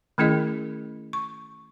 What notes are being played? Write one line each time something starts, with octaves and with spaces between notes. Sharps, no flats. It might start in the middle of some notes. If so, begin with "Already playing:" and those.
D#3 A3 C#4 E4 G#4 D#5
C#6